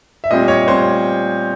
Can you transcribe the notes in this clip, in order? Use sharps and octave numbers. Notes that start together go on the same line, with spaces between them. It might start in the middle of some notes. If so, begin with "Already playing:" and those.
E5
A#2 G3 C4 D#5
C#5
A#2 G3 C4 C5